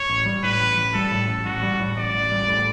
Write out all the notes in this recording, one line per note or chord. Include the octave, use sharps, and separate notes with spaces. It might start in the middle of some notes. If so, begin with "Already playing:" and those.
Already playing: C#5
A1
G3
A2 B4
A1
A1
G3 A4
A2
A1
A1 F#4
G3
A2
A1 D5
A1
G3
A2